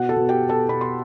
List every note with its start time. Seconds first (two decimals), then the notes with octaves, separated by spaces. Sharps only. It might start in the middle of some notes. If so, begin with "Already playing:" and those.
Already playing: B2 F#4 F#5
0.09 A4 A5
0.16 B2
0.29 G4 G5
0.42 B2
0.49 A4 A5
0.69 B2 B5
0.81 C6